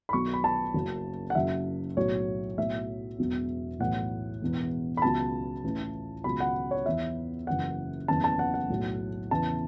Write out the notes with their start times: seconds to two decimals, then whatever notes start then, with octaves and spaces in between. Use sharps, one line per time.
0.09 B5
0.13 B1 B2 F#3 C#6
0.34 B5
0.44 A5
0.74 F#1 F#2 C#3 F#3
1.30 F#5
1.35 F#1 F#2 F#3 E5
1.97 B1 A2 F#3 C#5
2.58 B1 A2 F#3 E5
3.19 E1 E2 B2 F#3
3.80 B1 A2 E3 F#5
4.41 E1 E2 E3
4.97 B5
5.02 C#2 B2 F#3 A5
5.64 A1 A2 E3
6.24 C#2 B2 F#3 B5
6.40 F#5
6.71 C#5
6.86 E2 E3 E5
7.47 F#1 F#2 E3 F#5
8.08 F#1 E2 C#3 E3 A5
8.24 A5
8.39 F#5
8.54 F#5
8.70 B1 A2 F#3
9.31 E2 C#3 E3 A5